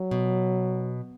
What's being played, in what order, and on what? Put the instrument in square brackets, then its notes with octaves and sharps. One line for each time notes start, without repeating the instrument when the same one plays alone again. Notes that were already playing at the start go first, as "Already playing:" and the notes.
Already playing: [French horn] F#3
[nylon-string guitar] B2